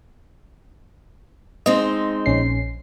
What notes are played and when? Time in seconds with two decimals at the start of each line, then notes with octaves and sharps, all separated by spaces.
1.66 G#3 C4 D#4 D#5
2.26 A#1 C#4 C7